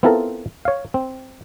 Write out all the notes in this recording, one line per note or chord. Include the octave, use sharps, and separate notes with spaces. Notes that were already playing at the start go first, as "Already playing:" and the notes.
B3 C4 E4 F4 A4 A#4
C#5 F5
C4